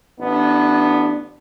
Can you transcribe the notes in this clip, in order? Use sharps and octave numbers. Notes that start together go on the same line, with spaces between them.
A1 B3 D4